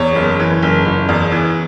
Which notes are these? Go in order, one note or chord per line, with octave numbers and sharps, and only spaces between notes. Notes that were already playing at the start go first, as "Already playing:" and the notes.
Already playing: E2 C#5
F#1
E3
F#1
F#1
E2
E3